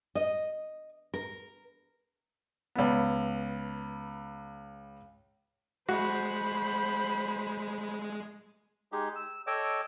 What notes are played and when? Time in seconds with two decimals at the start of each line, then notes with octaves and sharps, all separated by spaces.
0.15 D#5
1.14 A#4
2.75 C#2 B3
5.89 G#3 F#4 C5 B5
8.92 G#3 D#4 G4 G#4
9.16 E6
9.47 A4 C#5 D#5 G5 D6 E6